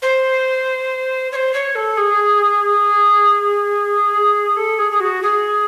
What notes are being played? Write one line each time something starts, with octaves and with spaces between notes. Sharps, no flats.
C5
C#5
C5
C#5
A4
G#4
A4
G#4
G#4
F#4
G#4